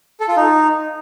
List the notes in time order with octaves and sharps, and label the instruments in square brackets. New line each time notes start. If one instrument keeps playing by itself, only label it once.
[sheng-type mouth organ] A4
F4
D#4